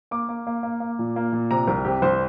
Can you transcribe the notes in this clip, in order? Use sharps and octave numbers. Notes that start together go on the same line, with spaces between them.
A#3 D6
A#3
A#3
A#3
A#3
A#2
A#3
A#2
C3 A#5
C2 A#4
C3 G4
C2 C5